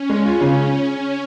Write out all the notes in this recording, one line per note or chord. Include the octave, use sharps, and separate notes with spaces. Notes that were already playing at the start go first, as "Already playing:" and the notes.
Already playing: C#4
G#3
F4
C#3